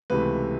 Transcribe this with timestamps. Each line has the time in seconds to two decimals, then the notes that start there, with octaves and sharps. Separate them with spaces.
0.10 C#2 C3 E3 A3 B4